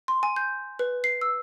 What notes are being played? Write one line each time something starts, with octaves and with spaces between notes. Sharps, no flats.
C6
G#5
G6
B4
C7
E6